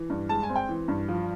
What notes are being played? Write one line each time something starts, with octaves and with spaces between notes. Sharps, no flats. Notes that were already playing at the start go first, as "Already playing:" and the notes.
Already playing: E3
G2
G#3 A5
G#5
C4
G5
E3
G2
F3